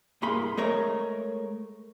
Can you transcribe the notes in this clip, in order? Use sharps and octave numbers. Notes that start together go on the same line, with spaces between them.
C2 G2 A#3 G#4 B5 C6
G#3 A3 A#4 C#5